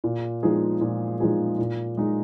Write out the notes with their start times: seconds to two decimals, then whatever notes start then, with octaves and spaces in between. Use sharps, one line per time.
0.04 A#2
0.43 F3 G#3 D#4 G#4
0.81 A#2
1.20 F3 G#3 D#4 G#4
1.58 A#2
1.97 G#3 D#4